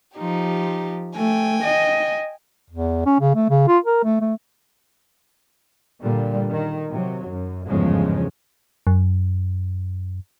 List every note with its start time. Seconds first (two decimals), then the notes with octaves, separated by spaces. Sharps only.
0.17 F3 D#4 G4
1.16 A3 G5 G#5
1.64 D#5
2.70 E2
3.06 C#4
3.20 C#3
3.35 A3
3.50 C#3
3.68 F4
3.84 A#4
4.04 A3
4.21 A3
6.02 A#2 D3 G3
6.50 D#3
6.91 C3 F#3
7.27 F#2
7.68 G1 E2 G#2 C#3 F3 G#3
8.87 F#2